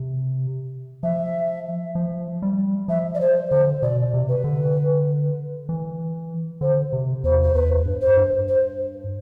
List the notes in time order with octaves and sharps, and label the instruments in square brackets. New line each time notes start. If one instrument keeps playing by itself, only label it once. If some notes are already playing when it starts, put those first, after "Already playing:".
Already playing: [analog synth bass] C3
[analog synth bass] F3 [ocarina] E5
[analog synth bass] F3
G3
[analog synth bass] F3 [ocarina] E5
[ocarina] D5
C5
[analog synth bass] D3 [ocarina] C5
[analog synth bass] B2 [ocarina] D5
[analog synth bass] C3
[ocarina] B4
[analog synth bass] D3
E3
[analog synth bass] D3 [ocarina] C5
[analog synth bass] C3
[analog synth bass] E2 [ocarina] C5
[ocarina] C5
[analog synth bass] E2 [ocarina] B4
[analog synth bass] G2
[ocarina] C5
[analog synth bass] G2
[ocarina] C5